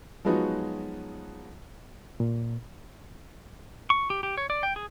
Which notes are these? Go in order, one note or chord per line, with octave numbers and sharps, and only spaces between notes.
F3 F#3 G#3 B3 D#4 F#4
A#2
C#6
G4
G4
C#5
D5
G5
G#4